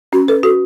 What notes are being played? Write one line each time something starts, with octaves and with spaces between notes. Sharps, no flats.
C#4 F#4
A4 B4
F#4 A4